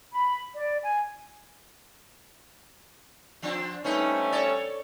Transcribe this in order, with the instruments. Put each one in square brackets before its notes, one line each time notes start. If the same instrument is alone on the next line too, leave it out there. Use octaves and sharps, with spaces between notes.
[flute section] B5
D5
G#5
[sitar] F3 C4 D4
[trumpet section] G3 A3 C#4 [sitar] C4 D#4 B4
[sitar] A4 C#5 D5